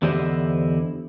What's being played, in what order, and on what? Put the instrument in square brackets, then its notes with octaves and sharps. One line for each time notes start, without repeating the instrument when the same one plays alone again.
[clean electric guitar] E2 D3 E4 G4 C5 D#5